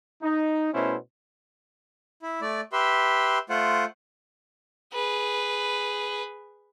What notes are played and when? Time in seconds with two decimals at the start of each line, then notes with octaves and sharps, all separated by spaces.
0.22 D#4
0.74 B2 A3 B3 C#4 E4 C5
2.22 E4
2.42 A3 D5
2.73 G4 B4 E5 C6
3.50 A3 F4 C5 F#5
4.94 G#4 B4